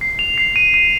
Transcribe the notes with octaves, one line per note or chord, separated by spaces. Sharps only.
C7
F7
C7
D#7
D#7